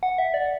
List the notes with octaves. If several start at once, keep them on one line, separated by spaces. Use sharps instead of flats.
F#5
E5
D5